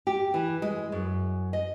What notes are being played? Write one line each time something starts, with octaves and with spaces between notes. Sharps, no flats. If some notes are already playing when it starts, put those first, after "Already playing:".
G4
E3
G#3
F#2
D#5